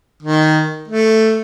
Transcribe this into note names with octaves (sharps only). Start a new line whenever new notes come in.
D#3
A3